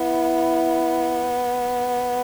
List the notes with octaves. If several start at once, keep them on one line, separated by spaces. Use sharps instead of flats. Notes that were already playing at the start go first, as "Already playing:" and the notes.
Already playing: B3 E4